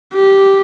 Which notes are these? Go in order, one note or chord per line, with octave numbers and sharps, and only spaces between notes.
G4